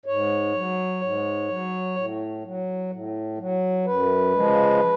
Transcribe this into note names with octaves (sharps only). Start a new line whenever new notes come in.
G#2 C#5
F#3
G#2
F#3
A2
F#3
A2
F#3
F#2 B4
C#3 F3 G#3